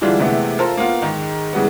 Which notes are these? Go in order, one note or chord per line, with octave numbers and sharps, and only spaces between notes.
D3 E3 G3 G#3 D4 F4
C3 E3 G#3 A3 B3
F4 A4 A#4 C5 F5
A#3 B3 F4
G#2 D#3 G#3
C#3 E3 G3 G#3 B3